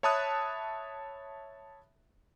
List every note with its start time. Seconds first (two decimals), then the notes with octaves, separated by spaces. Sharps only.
0.03 C#5 E5 A5 B5 D#6 F#6